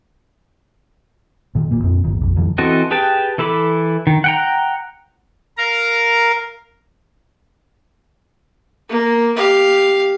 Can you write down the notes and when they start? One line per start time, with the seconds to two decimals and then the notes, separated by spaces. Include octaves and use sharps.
1.55 A#2 D#3
1.71 D1 A#2 A#3
1.84 F2 A#2 C4
2.04 G1 D#2
2.21 A#1 F2
2.36 F2 D3 E3 F#3
2.58 E3 C4 F#4 A4 D#5
2.91 G4 G#4 B4 G5 A5
3.38 E3 E4 A4 B5 D6
4.07 D#3
4.24 F#5 G5 A#5
5.58 A#4 F5 A#5
8.89 A#3
9.36 G4 F5